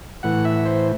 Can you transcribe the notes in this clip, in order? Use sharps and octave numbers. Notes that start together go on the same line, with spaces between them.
A2 E3 F#5
E5
C5